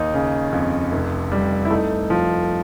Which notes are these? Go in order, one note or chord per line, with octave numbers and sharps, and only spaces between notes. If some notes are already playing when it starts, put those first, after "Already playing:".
Already playing: D#2 D#4
C#3
F2
F1
G3
E4
A3 D#4
F3